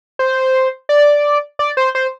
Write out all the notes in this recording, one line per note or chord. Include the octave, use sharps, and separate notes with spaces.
C5
D5
D5
C5
C5